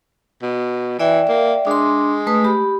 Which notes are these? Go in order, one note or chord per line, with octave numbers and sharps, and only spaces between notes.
B2
E3 D5 E5 G5
A#3
G#3 D4 C6
A3 B4 D#6
G4 B5